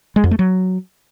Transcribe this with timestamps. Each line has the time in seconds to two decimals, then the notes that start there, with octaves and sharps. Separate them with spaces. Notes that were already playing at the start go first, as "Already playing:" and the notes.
0.16 G#3
0.24 F2
0.31 A3
0.39 F#3